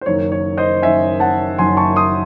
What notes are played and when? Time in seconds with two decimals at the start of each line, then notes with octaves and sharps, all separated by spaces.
0.01 C5
0.06 F#1 F#2 D#3 C#5
0.32 C#5
0.57 C5 D#5
0.82 F#1 F#2 D#3 E5 G#5
1.20 F#5 A5
1.58 F#1 F#2 D#3 G#5 C6
1.77 A5 C#6
1.96 C6 D#6